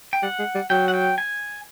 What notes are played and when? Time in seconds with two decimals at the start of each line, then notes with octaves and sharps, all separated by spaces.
0.13 G5
0.23 G3 F#5
0.39 G#3
0.55 G3
0.70 F#3 G5
0.88 F#5
0.94 G5
1.18 G#5